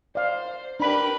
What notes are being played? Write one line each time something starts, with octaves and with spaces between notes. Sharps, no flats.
C5 D5 F5
D4 G4 A#4 B4 B5